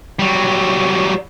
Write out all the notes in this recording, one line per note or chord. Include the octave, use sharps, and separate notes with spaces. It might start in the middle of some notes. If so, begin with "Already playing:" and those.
F#3 G3